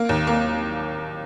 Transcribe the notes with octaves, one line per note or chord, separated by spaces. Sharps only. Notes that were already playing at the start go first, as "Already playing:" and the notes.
Already playing: A#3
D#2
A#3